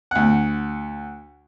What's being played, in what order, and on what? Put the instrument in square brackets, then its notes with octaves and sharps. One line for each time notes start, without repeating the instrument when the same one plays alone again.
[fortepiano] D2 F#5